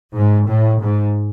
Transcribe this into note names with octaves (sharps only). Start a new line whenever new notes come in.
G#2
A2
G#2